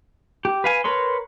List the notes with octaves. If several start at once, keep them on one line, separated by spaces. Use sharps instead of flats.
G4
B4 F5 G#5
A#4 B4 C#5 C6